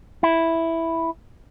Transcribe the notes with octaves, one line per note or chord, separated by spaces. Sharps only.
E4